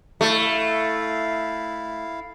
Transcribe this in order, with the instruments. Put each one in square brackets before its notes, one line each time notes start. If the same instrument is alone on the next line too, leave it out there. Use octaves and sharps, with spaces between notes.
[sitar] A3 [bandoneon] E4 F5